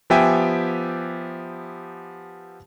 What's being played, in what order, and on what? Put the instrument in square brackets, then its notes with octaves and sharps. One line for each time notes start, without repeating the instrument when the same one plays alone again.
[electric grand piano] F3 B3 G4 E5 G5 G#5